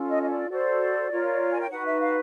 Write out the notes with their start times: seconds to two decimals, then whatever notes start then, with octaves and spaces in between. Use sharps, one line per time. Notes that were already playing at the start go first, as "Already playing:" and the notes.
Already playing: C#4 F4 A4
0.10 D#5
0.22 D#5
0.30 D5
0.49 F#4 A4 C5 D5
1.10 F4 A#4 C#5
1.52 G#5
1.61 G5
1.70 D#4 F#4 B4 F#5
1.85 E5
2.00 F5